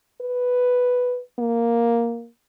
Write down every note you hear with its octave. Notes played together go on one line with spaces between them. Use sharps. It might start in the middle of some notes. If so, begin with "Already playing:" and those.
B4
A#3